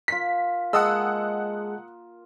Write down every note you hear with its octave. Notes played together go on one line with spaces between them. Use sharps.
F4 A#4 B6
G#3 A#3 G#4 D#5 F#5 A5 D#6 E6